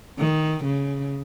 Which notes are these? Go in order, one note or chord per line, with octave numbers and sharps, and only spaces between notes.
D#3
C#3